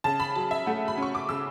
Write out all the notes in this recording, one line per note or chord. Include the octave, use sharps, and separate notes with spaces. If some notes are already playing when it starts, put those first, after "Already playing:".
C#3 A5
B5
F#3 A5
E5
A3 F#5
B5
C#4 C#6
D6
C#3 E6